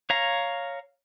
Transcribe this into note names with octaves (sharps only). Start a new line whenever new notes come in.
C#5 F5 A#5